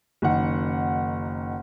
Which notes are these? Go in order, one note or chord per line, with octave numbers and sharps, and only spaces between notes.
F#1 D#3 F#5